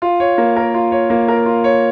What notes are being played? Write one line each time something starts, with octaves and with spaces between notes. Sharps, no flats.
F4
C#5
A#3
A#4
F4
C#5
A#3
A#4
F4
C#5